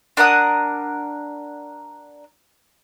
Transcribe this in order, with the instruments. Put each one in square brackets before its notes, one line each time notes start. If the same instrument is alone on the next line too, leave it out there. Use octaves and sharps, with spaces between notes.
[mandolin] D4 A#4 F#5 D#6